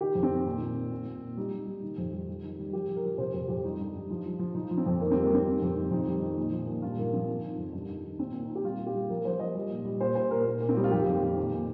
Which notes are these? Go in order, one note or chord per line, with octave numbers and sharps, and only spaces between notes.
D#3 G4
F2
C4
D#3
A#2
A#2
A#2
A#2
A#2
A#2
G3 D#4
G3
G3
D#3
F2
G3
G3
D#3
G3
F3 G4
F3
A#4
F3
C3 C5
F2 G4
F2 G4
G3 D#4
G2
G2
F3
F3
F3
F3 D#4
F3
C4
F2
D#3 A#3
G3 C4
A#3
G3 C4
G3
F2
D#3
F2 D#4
G3
D#3
A#2
F3
A#2
G2 F4
G2 A#3
F3 C4
D#3
D#3
F2
G2
D#3
D#3
A#2 C4
A#2
D#4
A#2
G4
G3 F4
A#2
G4
G3
F3 A#4
A#4
F3 C5
F3 D#5
G3
A#2
G3
A#2 C5
A#2 C5
A#2 A#4
A#2
A#2 A#3
C4
G3 D#4
F4
F2 G4
F2
D#3
A#2
A#2